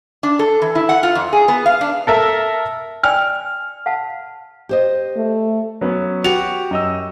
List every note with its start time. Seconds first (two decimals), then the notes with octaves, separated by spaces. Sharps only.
0.23 D4
0.39 A4
0.62 E3
0.75 E4
0.89 F#5
1.03 F4
1.15 F2
1.33 G#4
1.48 B3
1.66 F5
1.81 D4
2.07 A4 A#4 E5
3.03 D5 G5 G#5 F6
3.86 F5 F#5 A5
4.69 G4 C5 D#5
5.16 A3
5.81 F#3 B3 C#4
6.24 F#4 G4 F7
6.71 F#2 D#5 E6